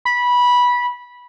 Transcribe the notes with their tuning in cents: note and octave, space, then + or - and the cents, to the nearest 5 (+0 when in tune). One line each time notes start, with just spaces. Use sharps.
B5 -15